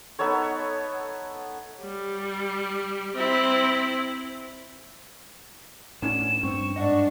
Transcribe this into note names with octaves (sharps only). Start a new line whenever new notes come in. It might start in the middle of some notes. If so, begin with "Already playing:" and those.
B3 D#4 A4 C#5
G3
C4 E4
A2 B3 C#4 D4 E7
G2 C4 C#6
G#2 D4 D#5 F#5